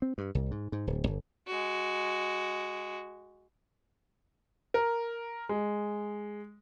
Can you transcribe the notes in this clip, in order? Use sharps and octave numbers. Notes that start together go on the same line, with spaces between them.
C4
G2
C2
G#2
G#2
D1
G1
G#3 F#4
A#4
G#3